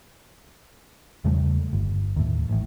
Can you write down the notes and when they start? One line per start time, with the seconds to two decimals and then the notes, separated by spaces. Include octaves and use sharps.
1.24 E2 C#3 G3 A3
1.73 G1
2.16 D#2 A2
2.49 A1 A2